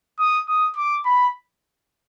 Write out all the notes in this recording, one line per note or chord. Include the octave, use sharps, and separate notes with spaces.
D#6
D#6
D6
B5